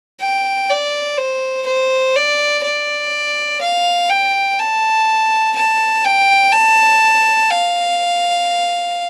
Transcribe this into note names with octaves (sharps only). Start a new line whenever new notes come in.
G5
D5
C5
C5
D5
D5
F5
G5
A5
A5
G5
A5
F5